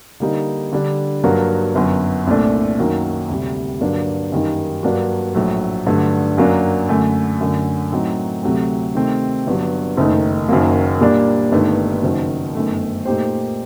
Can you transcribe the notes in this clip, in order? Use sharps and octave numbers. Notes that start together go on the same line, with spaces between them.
D3 G3 A#3 D#4
D3 G3 D4
G2 F#3 A#3 F#4 A#4
G1 F#2 F#3
C2 A#2 A3 D4
F#2 D#3 F#3 A#3
D2 C3 G3
G2 D3 F#3 A#3 D4
F#2 D#3 G3 A#3 D#4
G2 F#3 A#3 D4 F#4
A#1 A2 F#3 A3
G2 D3 F#3 A3
F#2 F#3 A#3 D4
F#2 D3 A3
F#2 D3 A3
A2 F#3 C4 D#4
D2 C3 F#3 A3 C4
C3 D#3 A3 C4 G4
G1 G2 F#3
F#1 F#2 D#3 A3 D#4
F#1 F#2 D#3 F#3 A#3
A#2 G3 A#3 D4
G1 G2 D#3 A3 D#4
F#1 F#2 D#3 F#3
G1 F#2 D#3 A3
A#2 A3 D#4 G4 C5